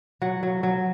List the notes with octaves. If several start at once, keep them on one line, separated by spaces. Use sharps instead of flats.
F#3 F#5
F#3
F#3